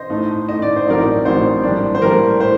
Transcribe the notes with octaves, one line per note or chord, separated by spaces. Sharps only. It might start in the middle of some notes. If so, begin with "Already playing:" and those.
Already playing: C5 D#5
A2 A3 D#4
A2 A3 D#4 D#5
D5
C5
A1 A2 F#3 C4 D#4 A#4 D5
A1 A2 F#3 C4 D#4 C5
A2 G3 A#3 D4
C5
A2 G3 A#3 D4 A#4
A2 C5